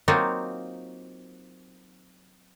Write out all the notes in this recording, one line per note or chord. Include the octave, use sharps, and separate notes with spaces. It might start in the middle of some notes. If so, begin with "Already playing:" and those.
F#3 A#3 C4 D#4 F4